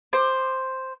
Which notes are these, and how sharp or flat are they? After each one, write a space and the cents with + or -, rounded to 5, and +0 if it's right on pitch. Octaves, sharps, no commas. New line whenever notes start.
C5 +0 D6 +20